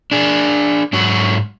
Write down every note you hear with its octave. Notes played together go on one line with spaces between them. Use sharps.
D4 G#4
G#2 F#3 F#4